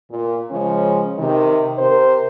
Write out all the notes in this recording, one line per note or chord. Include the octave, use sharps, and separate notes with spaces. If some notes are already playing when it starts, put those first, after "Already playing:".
A#2
C#3 F3 G#3 C#4
C3 D#3
C3 A#4 C5